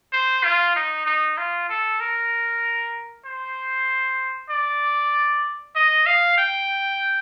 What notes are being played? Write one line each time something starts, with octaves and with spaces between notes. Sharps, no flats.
C5
F4
D#4
D#4
F4
A4
A#4
C5
D5
D#5
F5
G5